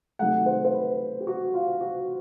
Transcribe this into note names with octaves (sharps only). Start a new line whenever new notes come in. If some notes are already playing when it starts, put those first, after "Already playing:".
C3 D#3 F#3 A3 F#5
C5
C5
B4
G4
F#4
F4
F#4